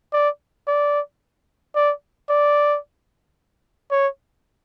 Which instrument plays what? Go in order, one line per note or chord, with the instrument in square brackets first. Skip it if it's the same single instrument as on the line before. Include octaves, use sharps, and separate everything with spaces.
[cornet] D5
D5
D5
D5
C#5